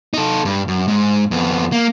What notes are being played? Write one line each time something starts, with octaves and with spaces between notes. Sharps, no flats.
D#4 A4
G2
F#2
G#2
F2 B3
A#3